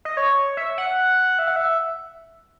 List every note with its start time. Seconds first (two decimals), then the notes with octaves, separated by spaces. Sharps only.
0.05 D#5
0.17 C#5
0.57 E5
0.78 F#5
1.39 E5
1.48 F#5
1.56 E5